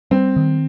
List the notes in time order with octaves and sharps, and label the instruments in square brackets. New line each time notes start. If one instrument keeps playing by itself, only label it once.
[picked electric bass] G3 [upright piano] C4
[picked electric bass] D#3